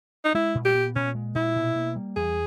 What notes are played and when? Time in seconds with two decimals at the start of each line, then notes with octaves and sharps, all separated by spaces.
0.25 D#4
0.34 G#3 E4
0.55 A#2
0.65 G4
0.75 B3
0.95 A#2 C#4
1.15 G#3
1.35 A#2 E4
1.56 B2
1.76 A#3
1.96 G3
2.16 E2 G#4